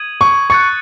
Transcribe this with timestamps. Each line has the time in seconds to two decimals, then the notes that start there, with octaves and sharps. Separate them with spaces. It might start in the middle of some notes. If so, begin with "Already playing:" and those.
Already playing: D#6 G#6 D#7 F#7
0.21 C#6
0.50 C#6 F#6 A6 C#7